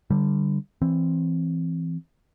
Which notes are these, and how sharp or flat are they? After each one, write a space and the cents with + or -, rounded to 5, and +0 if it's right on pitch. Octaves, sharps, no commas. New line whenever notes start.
D3 +0 G3 -10
E3 +10 C4 +5